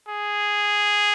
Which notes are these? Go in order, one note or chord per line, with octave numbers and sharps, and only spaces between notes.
G#4